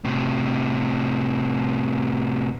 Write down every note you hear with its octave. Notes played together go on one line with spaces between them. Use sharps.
A2 C3